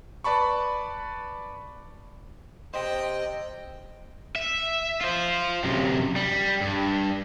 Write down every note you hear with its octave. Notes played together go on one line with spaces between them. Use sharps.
B4 D5 A5 B5 C#6
G4 C5 D#5 G5
E5
F4 C5
F#2 C3
G3
G2